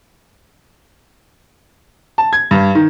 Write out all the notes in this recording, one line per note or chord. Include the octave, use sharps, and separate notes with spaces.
A5
G#6
G2
D#3